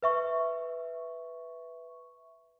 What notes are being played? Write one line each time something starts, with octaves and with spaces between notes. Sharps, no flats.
B4 E5 C#6